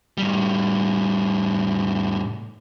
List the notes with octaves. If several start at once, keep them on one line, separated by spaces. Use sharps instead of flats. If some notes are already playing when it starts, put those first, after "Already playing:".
A2 G3